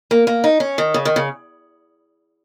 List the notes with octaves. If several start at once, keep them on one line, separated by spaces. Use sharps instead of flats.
A#3
A#3
D#4
C#4
D#3
C#3
D#3
C#3